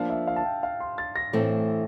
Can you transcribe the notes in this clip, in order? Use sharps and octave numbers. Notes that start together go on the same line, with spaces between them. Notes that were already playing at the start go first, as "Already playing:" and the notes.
Already playing: F3 A#3 D4 F5
E5
F5
A5
G5
F5
C6
A6
A#6
A2 E3 A3 C4